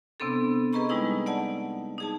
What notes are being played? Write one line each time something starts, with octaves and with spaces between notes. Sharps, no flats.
C3 B3 C4 D4 A4
G#4 B4 D#5 A#5 B5 C#6
G3 G#3 D#4 E4 G#4
D5 F#5 A5
D#4 G#4 A5